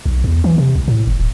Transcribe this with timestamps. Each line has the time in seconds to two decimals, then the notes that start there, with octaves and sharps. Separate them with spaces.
0.06 B1
0.24 E2
0.44 E3
0.58 C3
0.76 C2
0.88 A2
1.07 F#1
1.20 D1